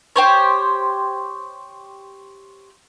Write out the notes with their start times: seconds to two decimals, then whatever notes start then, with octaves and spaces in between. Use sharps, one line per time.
0.16 G4 C5 C#5